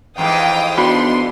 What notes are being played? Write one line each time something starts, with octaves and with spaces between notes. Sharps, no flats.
F2 G#2 E3 F5 G5 D#6
B3 D4 D#4 F#4 B5 C6